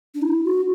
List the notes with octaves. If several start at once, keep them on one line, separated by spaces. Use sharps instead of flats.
D4
E4
F#4